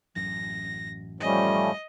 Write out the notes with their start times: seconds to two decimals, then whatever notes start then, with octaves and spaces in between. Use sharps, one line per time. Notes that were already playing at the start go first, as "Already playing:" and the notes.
0.16 A1 F#2 A#6
1.21 F3 G3 A3 C#4 D#5